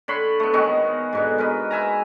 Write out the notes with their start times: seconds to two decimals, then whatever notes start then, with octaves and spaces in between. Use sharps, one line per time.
0.08 D3 C#5 B5 C6
0.40 A3 B3
0.53 D#3 G#3 B3 F#4
1.13 G#2 B2 D3
1.38 G#3 A#4 B4
1.71 B4 E5 G#5 A#5